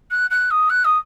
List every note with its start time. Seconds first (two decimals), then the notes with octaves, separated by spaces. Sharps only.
0.11 F#6
0.30 F#6
0.51 D#6
0.70 F#6
0.85 D#6